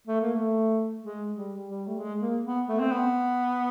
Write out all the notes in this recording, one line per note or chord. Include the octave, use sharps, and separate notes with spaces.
A3
A#3
A3
G#3
G3
G3
A3
G#3
A#3
B3
A3
C4
B3